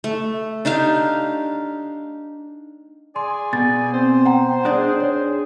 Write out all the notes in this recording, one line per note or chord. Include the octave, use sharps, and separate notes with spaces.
A3
D4 D#4 G4 F5
G#4 D5 G#5 C6
B2 A6
C4 C5
F#5 G5 A#5
D4 D#4 G#4 D5
C#5